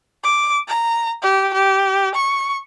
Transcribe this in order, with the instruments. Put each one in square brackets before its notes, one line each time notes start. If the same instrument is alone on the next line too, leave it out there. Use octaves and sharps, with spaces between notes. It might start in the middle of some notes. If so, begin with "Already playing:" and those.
[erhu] D6
A#5
G4
G4
C#6